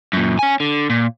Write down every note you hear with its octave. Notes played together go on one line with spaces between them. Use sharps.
F#2 A#2
C#4 G#5
D3
A#2